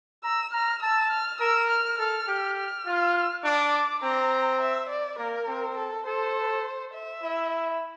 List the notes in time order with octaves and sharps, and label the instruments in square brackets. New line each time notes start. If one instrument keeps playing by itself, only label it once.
[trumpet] A#5 [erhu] E6
[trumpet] A#5 [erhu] F6
[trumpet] A5 [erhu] E6
[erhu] F6
[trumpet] A#4 [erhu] E6
[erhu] F6
[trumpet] A4 [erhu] F6
[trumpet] G4
[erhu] F6
[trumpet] F4
[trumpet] D4 [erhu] D6
[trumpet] C4 [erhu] A#5
[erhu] E5
D5
[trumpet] A#3 [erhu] A#4
[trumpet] C4
[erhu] A4
[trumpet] A4 [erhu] C5
[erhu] E5
[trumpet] E4